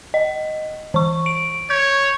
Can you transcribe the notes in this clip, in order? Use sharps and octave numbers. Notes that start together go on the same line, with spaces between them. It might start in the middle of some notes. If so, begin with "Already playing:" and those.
D#5
E3 C#6
D7
C#5 G6